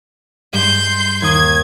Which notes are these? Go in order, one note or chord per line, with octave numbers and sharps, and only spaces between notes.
G2 G#3 C6 G6
D#2 D#6 G#6